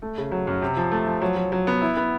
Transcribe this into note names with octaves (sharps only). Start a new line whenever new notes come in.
A3
C#3
F#3
F#2
C3
F3
A3
F3
F#3
F#3
F#3
B3
E4
B3